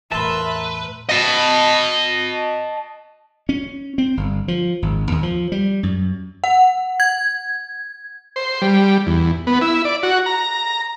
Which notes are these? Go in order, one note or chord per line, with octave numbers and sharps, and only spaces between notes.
E2 A2 A#4 B4 E5 A5 C6
D#5 A5
C#4
C4
G1
F3
G#1
D#2
F3
G3
F#2
F#5
G#6
C5
G3
E2
B3
E4
D5
F#4
A#5